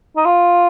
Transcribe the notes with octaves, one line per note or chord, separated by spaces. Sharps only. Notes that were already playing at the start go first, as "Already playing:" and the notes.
D#4
F4